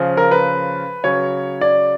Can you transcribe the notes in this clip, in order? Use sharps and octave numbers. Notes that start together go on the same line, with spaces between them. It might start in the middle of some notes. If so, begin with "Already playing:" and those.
Already playing: C#3 F3
A#4
B4
C#3 F#3 C#5
D5